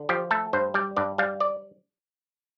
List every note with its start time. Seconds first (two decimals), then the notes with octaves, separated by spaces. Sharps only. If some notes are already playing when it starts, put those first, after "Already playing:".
Already playing: D3
0.09 F3 G4
0.31 A3 A4
0.53 G2 C5
0.74 G3 D5
0.97 G2 D5
1.18 G3 F5
1.40 D5